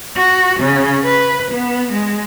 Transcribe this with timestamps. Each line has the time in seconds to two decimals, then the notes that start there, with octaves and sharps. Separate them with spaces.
0.16 F#4
0.61 C#3
1.04 B4
1.52 B3
1.93 G#3